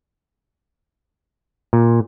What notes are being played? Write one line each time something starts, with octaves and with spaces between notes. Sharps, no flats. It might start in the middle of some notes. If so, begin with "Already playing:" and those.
A#2